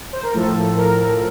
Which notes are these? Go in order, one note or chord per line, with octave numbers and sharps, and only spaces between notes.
C5
A#4
A2 F3 A4
A#4